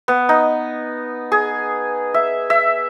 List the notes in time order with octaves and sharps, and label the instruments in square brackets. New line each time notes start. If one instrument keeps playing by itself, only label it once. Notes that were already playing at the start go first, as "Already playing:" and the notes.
[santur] B3
D#4
G#4
E5
E5